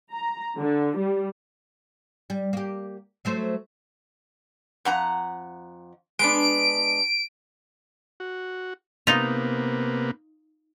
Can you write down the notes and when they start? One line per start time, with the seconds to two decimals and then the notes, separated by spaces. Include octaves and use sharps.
0.13 A#5
0.59 D3
0.98 G3
2.30 G3
2.53 A#3 G4
3.25 F#3 A3 C5
4.85 F2 F#5 A#5
6.19 G#3 B3 D4 D7
8.20 F#4
9.07 C3 A#3 B3 D#4 F4